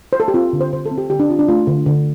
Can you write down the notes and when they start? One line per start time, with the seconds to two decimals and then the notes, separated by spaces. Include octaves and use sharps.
0.13 C5
0.20 A4
0.28 G4
0.34 C4 F4
0.53 D3
0.61 C5
0.73 D3 C5
0.86 A4
0.92 C4
0.98 G4
1.10 D3 G4
1.20 D4
1.30 C4 F4
1.39 D4
1.49 A3 F4
1.67 D3
1.86 D3